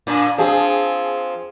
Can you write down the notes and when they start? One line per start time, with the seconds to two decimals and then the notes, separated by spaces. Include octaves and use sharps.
0.07 A#2 D4
0.38 F3 C4 G#4 A5